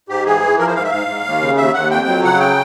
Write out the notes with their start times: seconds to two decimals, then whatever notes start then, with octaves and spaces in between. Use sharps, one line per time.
0.09 G#2 G4
0.26 E3 G#4
0.42 E3
0.59 F3 A#4
0.67 C5
0.75 G#2 F5
0.84 E5
0.91 G#2 F5
1.07 G#2
1.25 D#2
1.41 C#3
1.57 D#2 E5
1.74 D#2 F#5
1.91 F2 G5
2.07 F#3
2.23 C#3 F#5
2.40 G5